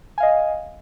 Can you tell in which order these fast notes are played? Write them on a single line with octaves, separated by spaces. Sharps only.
G#5 F5 D#5